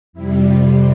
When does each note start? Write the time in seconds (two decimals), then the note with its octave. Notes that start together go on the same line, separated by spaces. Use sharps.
0.13 F2 C3 G3 E4
0.44 F4